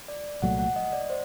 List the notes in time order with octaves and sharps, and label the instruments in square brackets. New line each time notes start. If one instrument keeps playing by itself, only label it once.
[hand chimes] D5
[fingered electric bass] C2 A#2 F#3 A3 [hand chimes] F#5
[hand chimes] F#5
D#5
D5
C5